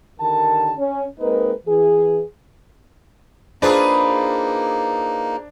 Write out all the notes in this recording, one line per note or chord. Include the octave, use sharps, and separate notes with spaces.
D3 D#3 G4 A#4 A5
C#4
G#3 A#3 C4 D#4 A#4 B4
E3 G#4
A#3 D4 D#4 F4 G#4 B4 C5